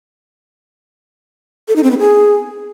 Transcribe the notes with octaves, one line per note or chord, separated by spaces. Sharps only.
A4
D#4
C4
B3
G#4